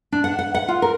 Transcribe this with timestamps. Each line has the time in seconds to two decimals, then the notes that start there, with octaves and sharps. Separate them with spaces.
0.12 D4
0.24 F#5
0.39 F#5
0.55 F#5
0.68 F4
0.82 A#4